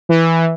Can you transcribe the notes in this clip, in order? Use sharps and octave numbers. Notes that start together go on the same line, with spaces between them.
E3